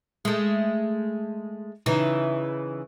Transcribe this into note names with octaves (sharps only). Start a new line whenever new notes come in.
G#3 A3
C#3 E3 D#4